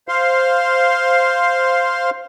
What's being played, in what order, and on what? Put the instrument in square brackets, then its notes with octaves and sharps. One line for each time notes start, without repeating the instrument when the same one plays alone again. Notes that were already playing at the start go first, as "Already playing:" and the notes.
[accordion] C5 F5 C6